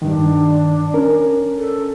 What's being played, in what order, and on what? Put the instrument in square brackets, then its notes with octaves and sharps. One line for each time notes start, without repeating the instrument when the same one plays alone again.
[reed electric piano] G2 D#3 [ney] D4
[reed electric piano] C#4 A#4
[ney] A4